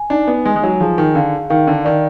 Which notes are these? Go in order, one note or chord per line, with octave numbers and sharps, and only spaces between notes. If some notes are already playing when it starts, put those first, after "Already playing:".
Already playing: G#5
D4 D#4
B3
G#3 G#5
G#3
F#3
F3 G#4
D#3
D3 F5
D#3 F5
D3
D#3 D5